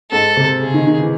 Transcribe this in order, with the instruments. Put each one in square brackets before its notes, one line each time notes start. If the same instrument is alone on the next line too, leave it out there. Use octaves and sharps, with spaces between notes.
[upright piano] G#2 [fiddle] A4
[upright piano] C3
[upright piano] C#3 [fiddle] G#4
[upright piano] D#3
D#3
E3